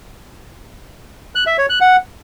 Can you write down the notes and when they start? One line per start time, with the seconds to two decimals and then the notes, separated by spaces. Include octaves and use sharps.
1.35 F#6
1.47 E5
1.58 C#5
1.69 F#6
1.81 F#5